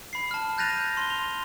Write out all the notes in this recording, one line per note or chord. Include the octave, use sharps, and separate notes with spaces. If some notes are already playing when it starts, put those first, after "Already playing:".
B5 C7
A5 F6
F#6 G6 A6 A#6 D#7 F7
C6 G7
F7